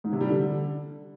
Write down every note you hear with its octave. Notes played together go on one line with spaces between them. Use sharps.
G#2
C3
G3
D3